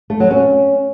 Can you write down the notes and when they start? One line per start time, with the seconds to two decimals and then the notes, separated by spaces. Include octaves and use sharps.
0.10 A3
0.20 F#3
0.30 C#4